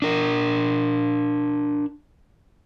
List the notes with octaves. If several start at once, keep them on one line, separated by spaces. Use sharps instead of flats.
D4 A#4